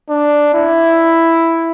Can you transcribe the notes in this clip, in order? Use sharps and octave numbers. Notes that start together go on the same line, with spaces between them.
D4
E4